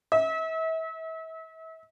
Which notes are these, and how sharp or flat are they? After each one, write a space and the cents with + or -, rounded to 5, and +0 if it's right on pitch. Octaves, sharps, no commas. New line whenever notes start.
E5 -35